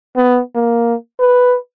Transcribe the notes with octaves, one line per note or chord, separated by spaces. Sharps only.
B3
A#3
B4